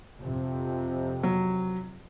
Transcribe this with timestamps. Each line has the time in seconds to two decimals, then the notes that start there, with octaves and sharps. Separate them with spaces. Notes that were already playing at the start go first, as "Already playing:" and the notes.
0.21 F2 C3
1.23 F#3